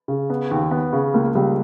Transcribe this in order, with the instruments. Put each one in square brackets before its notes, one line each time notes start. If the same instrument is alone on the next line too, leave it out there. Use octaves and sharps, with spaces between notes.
[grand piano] C#3
B3
D#2
B3
C#3
[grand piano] C#2 [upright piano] A#3
[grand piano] C#2 [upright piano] G3